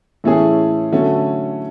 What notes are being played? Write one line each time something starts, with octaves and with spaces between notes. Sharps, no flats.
A2 E3 A3 C#4 G#4
D3 F#3 A3 C#4